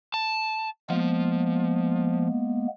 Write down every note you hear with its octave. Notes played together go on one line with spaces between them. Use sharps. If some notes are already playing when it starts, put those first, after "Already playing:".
A5
F3 G#3 A#3 B3